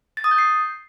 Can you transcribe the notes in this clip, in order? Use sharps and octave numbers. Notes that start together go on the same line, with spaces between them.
A6
D#6
G6
C7